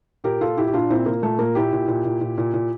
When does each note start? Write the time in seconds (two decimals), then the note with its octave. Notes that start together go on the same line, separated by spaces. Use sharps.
0.24 A#2 G4 A#4
0.41 A#2 F4 A4
0.57 A#2 E4 G4
0.67 G4
0.73 A#2 D4 F4
0.90 A#2 C4 E4
1.06 A#2 A#3
1.22 A#2 A3
1.39 A#2 A#3
1.55 A#2 E4 G4
1.73 A#2
1.88 A#2
2.05 A#2
2.21 A#2
2.38 A#2
2.54 A#2